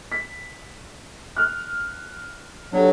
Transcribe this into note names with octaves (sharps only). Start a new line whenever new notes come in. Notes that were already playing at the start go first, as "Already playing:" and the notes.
B6
F6 F#6
F#3 D4 G4 A4